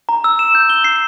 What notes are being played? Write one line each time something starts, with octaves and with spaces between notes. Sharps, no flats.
A#5
E6
E7
G6
G7
C7